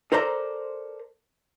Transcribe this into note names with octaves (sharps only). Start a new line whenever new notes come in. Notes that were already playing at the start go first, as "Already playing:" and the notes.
A4 A#4 C5 D5 F5 A#5